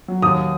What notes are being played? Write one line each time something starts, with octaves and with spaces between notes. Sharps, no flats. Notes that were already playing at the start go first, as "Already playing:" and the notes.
F#3
D#2 D#6